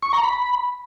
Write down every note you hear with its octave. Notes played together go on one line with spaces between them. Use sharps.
C#6
A#5
B5